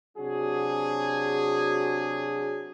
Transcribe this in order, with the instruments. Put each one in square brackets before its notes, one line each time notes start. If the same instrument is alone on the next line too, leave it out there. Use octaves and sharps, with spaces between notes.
[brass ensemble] C3 F#3 D4 F#4 G#4